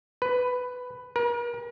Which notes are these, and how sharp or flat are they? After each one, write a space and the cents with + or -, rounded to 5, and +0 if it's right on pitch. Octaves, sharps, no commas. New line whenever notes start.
B4 +10
A#4 +40